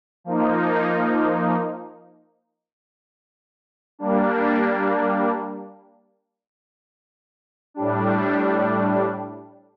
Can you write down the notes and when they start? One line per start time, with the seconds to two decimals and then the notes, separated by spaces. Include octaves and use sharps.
0.24 F3 A#3 D#4
3.99 G3 A#3 D4
7.74 A2 G3 D4